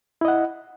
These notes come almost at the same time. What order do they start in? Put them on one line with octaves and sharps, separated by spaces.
E4 D#5 F#5